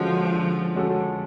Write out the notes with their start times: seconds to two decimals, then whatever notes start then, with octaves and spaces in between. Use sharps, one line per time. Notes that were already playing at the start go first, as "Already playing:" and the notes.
Already playing: D3 F3 G#3 C#4 F#4 A4
0.33 D3
0.75 G#3 C#4 F#4 A4